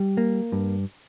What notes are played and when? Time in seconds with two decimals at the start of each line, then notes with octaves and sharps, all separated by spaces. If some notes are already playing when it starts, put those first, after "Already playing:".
Already playing: G3
0.17 A#3
0.52 G2